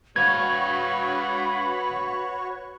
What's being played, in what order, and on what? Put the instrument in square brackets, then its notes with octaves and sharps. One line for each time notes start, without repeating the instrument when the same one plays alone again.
[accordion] F#4 C#5 C#6 [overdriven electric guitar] B4 F5 [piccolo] B5 [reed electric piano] G#6